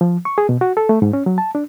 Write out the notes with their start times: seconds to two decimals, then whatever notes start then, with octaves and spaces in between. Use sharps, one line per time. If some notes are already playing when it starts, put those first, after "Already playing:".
0.01 F3
0.25 C#6
0.38 G#4
0.49 B2
0.61 F#4
0.77 A4
0.89 A3
1.02 G#2
1.13 C#4
1.26 F#3
1.38 A5
1.55 D4